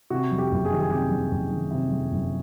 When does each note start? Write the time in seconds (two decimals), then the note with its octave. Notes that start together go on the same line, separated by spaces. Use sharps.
0.10 C3 F#4
0.31 F2
0.38 G4
0.52 F#1
0.65 G#4
0.71 D#3 G4
0.81 G#4
0.90 C3 G4
1.11 F2
1.31 F#1
1.51 D#3
1.71 C3
1.92 F2
2.11 F#1